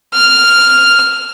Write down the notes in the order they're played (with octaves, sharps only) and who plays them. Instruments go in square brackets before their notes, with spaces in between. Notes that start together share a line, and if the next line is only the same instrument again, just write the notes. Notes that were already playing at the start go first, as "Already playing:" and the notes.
[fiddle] F6